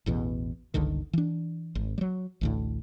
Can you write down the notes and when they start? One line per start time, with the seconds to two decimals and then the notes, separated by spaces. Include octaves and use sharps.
0.06 A1 E2 B2
0.74 G1 C#2 D3 D#3
1.13 E3 D4
1.75 G#1
1.98 F#3 G3
2.41 A1 D2 A2